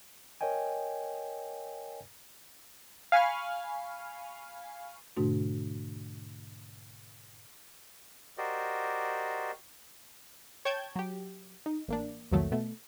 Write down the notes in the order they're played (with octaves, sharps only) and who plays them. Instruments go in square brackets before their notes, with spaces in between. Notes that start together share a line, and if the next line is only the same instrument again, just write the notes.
[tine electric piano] A#4 C#5 D#5 G5 G#5
[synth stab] F5 G#5 B5 C#6 F6
[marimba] G#2 B2 D3 A3 D4 F#4
[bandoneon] F#4 G4 A#4 C5 D5 D#5
[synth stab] C#5 G5 A5 G6 G#6
F#3 G4
D#4
A1 A#3 D4
C2 F2 A#2 D#3 F#3 A3
B2 A3